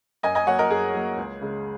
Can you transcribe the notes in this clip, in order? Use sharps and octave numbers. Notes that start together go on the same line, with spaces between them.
F#2 D#5 G#5
D#5 G#5
F#3 A#3 C#5 F#5
A#4 D#5
F#2 G#4
F#3 A#3
C#2
C#3 G#3